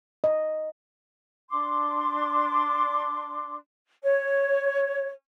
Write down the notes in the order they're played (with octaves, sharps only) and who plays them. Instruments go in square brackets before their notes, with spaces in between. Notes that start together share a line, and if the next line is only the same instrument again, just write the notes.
[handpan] D#5
[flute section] D4 C6 D6
C#5